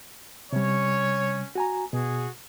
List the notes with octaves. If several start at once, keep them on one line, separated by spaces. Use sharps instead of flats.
C3 G3 C#4 C#5
F#4 G#5 A#5
B2 F#4 G#4